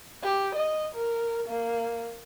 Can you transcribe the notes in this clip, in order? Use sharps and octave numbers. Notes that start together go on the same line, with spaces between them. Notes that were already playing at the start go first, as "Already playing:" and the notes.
G4
D#5
A#4
A#3